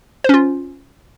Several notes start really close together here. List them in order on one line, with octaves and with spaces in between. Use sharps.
C5 C#4 F4